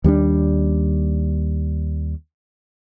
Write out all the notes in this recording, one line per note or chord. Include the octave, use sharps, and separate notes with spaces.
D#2 G3 A#3 D4